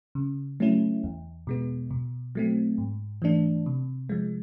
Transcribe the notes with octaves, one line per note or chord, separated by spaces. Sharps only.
C#3
F#3 A3 C#4 E4
E2
B2 G#3 B3
B2
F#3 A3 C4
G#2
E3 A3 D4
C3
F3 G#3